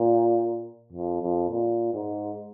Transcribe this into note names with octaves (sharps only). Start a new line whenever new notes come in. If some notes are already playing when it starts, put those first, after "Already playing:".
Already playing: A#2
F2
F2
A#2
G#2